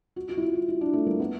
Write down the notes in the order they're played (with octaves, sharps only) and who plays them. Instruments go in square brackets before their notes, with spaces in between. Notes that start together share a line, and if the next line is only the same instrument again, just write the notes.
[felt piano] F#4
F#4
E4
F4
E4
E4
D4
A3
A#3
B3